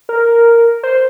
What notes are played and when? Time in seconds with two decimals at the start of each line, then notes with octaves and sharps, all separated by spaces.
0.09 A#4
0.83 C5